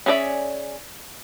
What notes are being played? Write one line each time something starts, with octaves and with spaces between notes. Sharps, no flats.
C#4 G#4 A4 D5 E5